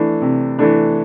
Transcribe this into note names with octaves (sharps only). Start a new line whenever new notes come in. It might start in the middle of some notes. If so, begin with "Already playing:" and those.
Already playing: E3 A3 D4
C3
E3 A3 D4